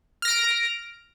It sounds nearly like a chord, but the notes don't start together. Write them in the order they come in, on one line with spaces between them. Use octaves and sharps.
F6 A#6 D7